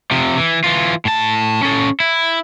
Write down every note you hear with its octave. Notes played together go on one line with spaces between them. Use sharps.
C3 F3
E3
E3 F4
A2 A5
C#4 A4
E4